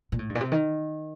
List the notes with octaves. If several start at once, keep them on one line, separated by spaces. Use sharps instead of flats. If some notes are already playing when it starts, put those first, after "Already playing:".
A#2
A2
G2
A#2
C3
D#3